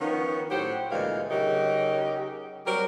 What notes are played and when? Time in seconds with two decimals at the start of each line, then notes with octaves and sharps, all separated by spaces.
0.01 D#3 F3 B3 C#4 C#5
0.51 A2 F#3 G4 C5 F#5
0.91 D2 A#2 E3 G#3 F5
1.30 C#3 F#3 D#4 G4 A#4
2.66 F#3 G3 C4 A#4